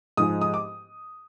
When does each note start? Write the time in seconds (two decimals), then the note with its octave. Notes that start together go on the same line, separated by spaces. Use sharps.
0.17 G#2 F3 G#3 D#6
0.41 D#6
0.54 D6